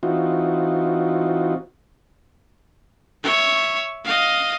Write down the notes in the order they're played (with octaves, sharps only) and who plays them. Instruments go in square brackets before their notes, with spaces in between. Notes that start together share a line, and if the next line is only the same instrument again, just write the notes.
[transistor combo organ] E3 C4 D#4 F4 F#4
[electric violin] C#5 E5
D#5 F5